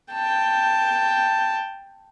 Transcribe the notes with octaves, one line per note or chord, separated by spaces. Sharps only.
G5 A5